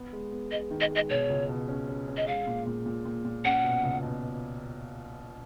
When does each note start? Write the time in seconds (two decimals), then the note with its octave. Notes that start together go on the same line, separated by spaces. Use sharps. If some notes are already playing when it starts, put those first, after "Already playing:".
Already playing: B3
0.13 G#3
0.32 B3
0.51 G#3 D#5
0.71 D#3
0.80 D#5
0.91 G#3 D#5
1.10 B2 C#5
1.30 C#2
1.49 B2
1.68 C#4
1.88 C#4
2.08 C#4
2.17 D#5
2.27 G#3 F5
2.47 A#2
2.67 A#2
2.86 A#2
3.05 A#2
3.25 A#2
3.44 C#4 F#5
3.64 B2
3.84 C#2
4.03 B2